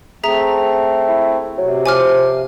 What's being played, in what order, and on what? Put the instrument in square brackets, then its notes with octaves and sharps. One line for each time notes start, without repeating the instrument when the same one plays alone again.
[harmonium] A3 C4 [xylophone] G#4 E5 A#5
[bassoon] E4
[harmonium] C3 [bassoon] F#3
[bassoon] F3 [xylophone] G#5 D6 F6